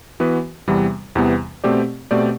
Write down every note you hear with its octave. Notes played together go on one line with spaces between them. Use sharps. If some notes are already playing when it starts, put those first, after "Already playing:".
E3 B3 F#4 B4
E2 C3 E3 G3 B3
E2 C3 E3 G3 B3
B2 A3 C4 G4 D5
B2 A3 C4 G4 D5